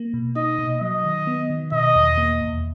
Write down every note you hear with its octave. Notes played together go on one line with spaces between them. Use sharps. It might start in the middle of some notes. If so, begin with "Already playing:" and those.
Already playing: A#3
B2
D#4 D#5
B2
F#3 D#5
D#3
B3
D#3
B2 D#5
E2
A#3
E2